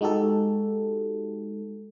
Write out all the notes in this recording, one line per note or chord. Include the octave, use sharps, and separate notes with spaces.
G#3 D#4 F#4 G4 A4